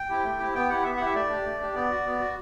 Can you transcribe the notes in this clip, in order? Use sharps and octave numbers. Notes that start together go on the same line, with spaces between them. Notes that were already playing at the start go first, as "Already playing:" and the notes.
Already playing: G5
C4 E4 G4
A3
C4 E4 G4
B3 G5
E4 G4 F#5
B3 E5
E4 G4 F#5
E5
A3 D5
D4 G4
A3
D4 G4
B3 D5
F#4
B3
F#4